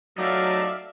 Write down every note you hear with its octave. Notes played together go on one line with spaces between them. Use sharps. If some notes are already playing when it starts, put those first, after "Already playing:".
F#3 A3 D#4 D5 E5 F5